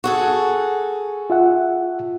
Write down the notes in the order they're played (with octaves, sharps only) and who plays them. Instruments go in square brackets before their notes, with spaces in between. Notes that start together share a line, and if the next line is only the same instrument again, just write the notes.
[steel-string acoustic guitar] F#4 G#4 A4
[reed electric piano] F4 E5 F#5